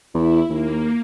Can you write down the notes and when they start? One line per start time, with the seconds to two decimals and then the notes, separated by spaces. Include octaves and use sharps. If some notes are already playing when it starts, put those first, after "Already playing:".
0.14 E2 E4
0.50 D#2 A#3